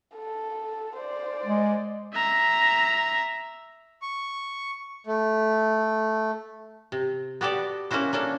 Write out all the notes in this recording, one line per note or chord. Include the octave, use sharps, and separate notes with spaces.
A4
C5 D5
G#3
E5 A#5
C#6
A3
C3
B3 F#4 G4 A4 D5
A#3 C#4 E4 F#4 C5
A#3 C#4 D4 A4